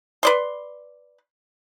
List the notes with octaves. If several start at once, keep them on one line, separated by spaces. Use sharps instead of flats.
B4 D5 C6